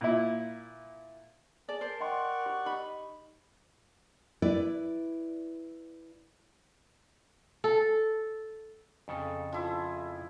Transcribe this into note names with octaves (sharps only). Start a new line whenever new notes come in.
A#2 E4
G#4 D5 A5
A#4 C5
D5 D#5 F#5 G5 C6 C#6
G4
D#4 G4 B5
E4 B4 D5
A4
F2 C#3 A4
F3 E4 F4